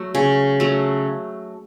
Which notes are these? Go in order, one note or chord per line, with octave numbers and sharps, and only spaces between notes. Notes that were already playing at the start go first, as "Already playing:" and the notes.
Already playing: F#3 A3
C#3
F#3 A3